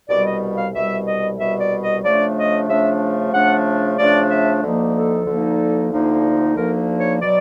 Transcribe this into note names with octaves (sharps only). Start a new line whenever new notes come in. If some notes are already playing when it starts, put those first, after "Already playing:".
C2 B2 G3 D5
D#5
F5
C2 B2 G3 E5
D#5
C2 B2 G3 E5
D5
D#5
C#3 F3 A3 D4 D5
D#5
C#3 F3 A3 D4 E5
C#3 F3 A3 D4 F#5
C#3 F3 A3 D4 D5
E5
D2 D3 F3 A#3 D#4
A4
D2 D3 F3 A#3 D#4
D2 D3 F3 A#3 D#4
D2 D3 F3 A#3 D#4 A#4
C#5
B2 F#3 D5